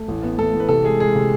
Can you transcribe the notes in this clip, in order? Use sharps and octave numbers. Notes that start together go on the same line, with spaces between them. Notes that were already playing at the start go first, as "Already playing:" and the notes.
Already playing: A3
A1
B3
A1 A4
A1
B4
C3 A4
G#3 G#4
G#3 G#4
C3